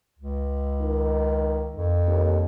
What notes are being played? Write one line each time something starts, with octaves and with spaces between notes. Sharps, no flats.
C#2
D#3
F2
D#2